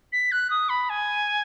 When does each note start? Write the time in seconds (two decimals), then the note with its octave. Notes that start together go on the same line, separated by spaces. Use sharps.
0.12 B6
0.31 F#6
0.50 D#6
0.69 B5
0.89 G#5